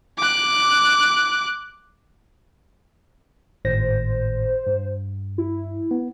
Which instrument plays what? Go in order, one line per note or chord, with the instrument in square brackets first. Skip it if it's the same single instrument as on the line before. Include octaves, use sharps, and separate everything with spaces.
[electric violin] D6 F#6
[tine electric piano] G#1 A2 A#6 [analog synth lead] C5
[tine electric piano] G2
[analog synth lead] E4
[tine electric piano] B3